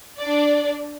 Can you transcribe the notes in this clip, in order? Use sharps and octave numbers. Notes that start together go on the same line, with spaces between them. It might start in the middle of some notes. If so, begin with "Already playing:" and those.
D4 D5